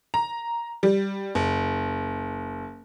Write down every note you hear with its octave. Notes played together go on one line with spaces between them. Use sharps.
A#5
G3
F#1